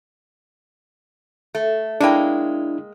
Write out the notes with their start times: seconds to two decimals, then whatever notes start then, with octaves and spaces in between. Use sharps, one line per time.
1.55 A3
2.00 G#3 A#3 D4 E4 G5